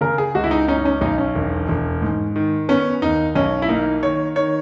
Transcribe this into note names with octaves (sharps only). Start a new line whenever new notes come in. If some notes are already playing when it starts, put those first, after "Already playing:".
C#3 A#4
G#4
C#2 F#4
E4
D#4
C#4 D#4
D#4
C#4
B1 D#4
C#4
E1
E1
G#2
D#3
B3 C#4
D#2 D#4
B1 C#4
E4
A#3 D#4
D#3 C#5
D#3 C#5